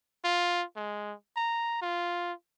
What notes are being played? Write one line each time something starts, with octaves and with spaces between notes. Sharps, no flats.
F4
G#3
A#5
F4